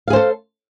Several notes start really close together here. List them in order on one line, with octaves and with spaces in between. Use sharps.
F5 G#4 C5 A4